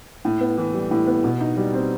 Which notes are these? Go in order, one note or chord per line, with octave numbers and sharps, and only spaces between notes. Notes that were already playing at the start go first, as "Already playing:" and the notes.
A2
B3
E3
G3
A2
B3
B2
D#4
G3
C4